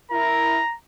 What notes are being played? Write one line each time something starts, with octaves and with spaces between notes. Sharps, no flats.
E4 A#4 A#5